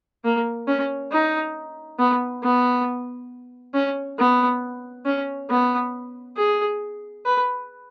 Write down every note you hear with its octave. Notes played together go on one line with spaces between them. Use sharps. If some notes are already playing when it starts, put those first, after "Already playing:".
A#3
C#4
D#4
B3
B3
C#4
B3
C#4
B3
G#4
B4